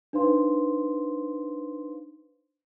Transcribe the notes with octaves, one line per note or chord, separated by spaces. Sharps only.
D4 D#4 B4 C5 F5 C6